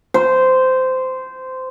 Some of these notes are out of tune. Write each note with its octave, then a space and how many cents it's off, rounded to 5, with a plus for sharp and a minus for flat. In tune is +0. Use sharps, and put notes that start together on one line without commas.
C5 -15